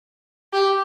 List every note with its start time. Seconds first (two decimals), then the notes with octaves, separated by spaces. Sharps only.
0.53 G4